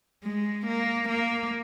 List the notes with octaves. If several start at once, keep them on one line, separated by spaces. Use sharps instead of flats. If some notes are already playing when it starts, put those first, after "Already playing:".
G#3
A#3
A#3